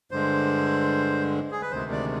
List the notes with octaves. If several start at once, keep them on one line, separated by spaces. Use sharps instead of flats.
G2 D3 G#3 C5
G#4
B4
D2 C3 D#3 G#3 C5
D5